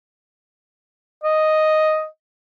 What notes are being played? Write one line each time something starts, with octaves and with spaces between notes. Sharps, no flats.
D#5